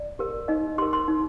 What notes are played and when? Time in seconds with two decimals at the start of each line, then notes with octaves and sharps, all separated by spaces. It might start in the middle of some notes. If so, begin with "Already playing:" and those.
Already playing: D5
0.19 G4 A#4
0.48 D#4 D#5
0.78 G4 A#4 C6
0.93 C6
1.08 D#4